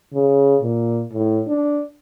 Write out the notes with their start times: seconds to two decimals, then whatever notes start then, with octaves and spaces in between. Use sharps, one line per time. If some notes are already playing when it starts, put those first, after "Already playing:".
0.14 C#3
0.62 A#2
1.13 A2
1.48 D4